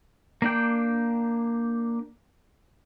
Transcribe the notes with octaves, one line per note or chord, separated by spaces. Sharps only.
A#3 D4 G5